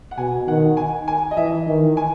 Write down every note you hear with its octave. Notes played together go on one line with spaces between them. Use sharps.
F#5
B2 G#5
D#3 F#5
G#5
G#5
D#5
E3 E5
D#3
G#5